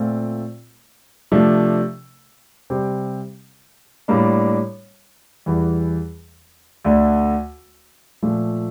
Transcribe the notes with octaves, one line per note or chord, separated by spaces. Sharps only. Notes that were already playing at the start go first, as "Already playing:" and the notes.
Already playing: A#2 A3 C4 F4
C3 F3 A3 D4
C3 G3 C4 G4
A2 G3 A#3 D4
E2 E3 G3
D2 D3 A3
A#2 F3 A3